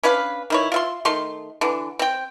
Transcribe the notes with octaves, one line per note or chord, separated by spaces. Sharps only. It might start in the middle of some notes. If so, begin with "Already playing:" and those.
C#4 D4 B4 F5
D#3 E4 C#5
F4 E5 C6
D#3 A3 C6
D3 E3
C4 G5